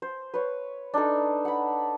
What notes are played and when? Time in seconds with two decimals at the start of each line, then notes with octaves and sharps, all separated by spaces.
0.02 C5
0.34 B4 C#5
0.94 D4 D#4 A4
1.45 F#5 B5